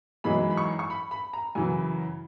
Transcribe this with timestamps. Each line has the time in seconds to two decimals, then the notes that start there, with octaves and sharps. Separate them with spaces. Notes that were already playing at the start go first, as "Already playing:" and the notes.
0.24 F#2 E3 G#3 D#4 B5
0.50 B5
0.57 C#6
0.79 C#6
0.90 B5
1.11 B5
1.33 A#5
1.55 F#2 C#3 E3 G#5